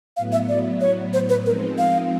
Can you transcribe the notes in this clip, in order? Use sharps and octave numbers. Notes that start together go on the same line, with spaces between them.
A2 F#3 B3 F5
E5
D5
C#5
C5
B4
F3 G#3 C4 D#4 A#4
F5